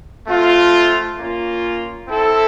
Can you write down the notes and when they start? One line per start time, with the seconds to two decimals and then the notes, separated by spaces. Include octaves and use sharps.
0.27 A3 C4 F4
1.18 A#3 C#4 F4
2.08 C4 E4 A4